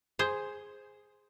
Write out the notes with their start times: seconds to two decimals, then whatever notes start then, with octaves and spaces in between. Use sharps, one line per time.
0.19 G#4 C5